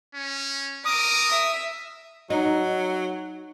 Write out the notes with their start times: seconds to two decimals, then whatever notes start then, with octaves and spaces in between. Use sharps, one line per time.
0.15 C#4
0.85 A#4 D6 D#6 D7
1.30 E5
2.30 F#3 D#4